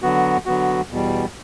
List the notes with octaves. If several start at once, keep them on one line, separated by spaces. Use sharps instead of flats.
D3 F#3 B3 F#4
D3 F#3 B3 F#4
E2 B2 G3